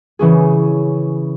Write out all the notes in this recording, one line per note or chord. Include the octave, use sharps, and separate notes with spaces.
C#3 E3 C#4 G#4